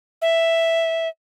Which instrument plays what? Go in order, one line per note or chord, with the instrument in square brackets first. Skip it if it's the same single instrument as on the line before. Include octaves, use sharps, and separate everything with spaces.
[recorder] E5